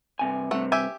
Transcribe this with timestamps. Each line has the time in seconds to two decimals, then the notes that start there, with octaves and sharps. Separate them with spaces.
0.19 G2 C3 G#5
0.51 G2 C3 A3 F#5
0.72 G4 E5 G#5